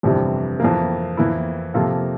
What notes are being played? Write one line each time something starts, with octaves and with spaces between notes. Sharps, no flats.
G1 F2 C3 E3 G3
F2 E3 A#3
F2 E3 A#3 E4
C3 F3 A#3 F4 A4